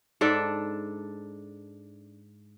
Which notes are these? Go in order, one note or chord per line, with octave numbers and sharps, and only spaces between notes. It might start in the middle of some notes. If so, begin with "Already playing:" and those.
G#2 D4 A4 D5